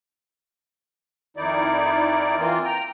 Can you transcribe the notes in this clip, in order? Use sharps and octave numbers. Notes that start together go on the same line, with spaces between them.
F2 D#3 D#4 E4 D5
E3 A#3 C4 F4
G5 A#5